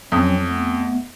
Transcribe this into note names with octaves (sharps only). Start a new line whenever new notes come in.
F2 F#3 C4 C#4
A3 B3